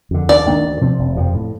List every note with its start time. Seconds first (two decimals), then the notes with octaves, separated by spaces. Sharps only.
0.11 F2 D3
0.29 D#2 D5
0.46 D#3 A#3 D4
0.64 D2
0.81 C3 F3 C4
0.99 F1
1.16 F2 C3 F3
1.34 A2